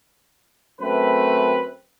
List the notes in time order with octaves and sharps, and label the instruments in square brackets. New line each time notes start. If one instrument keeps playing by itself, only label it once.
[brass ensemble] F#2 A3 C4 B4